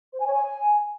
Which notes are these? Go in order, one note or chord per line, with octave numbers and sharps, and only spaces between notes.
C5
G#5
C#5
G#5